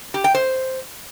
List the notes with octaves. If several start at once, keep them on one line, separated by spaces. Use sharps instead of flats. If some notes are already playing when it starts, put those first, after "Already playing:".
G4
G5
C5